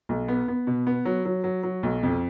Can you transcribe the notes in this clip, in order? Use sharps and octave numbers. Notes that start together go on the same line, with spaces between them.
B1
B3
B3
B2
B3
F#3
F#3
F#3
F#3
B1
F2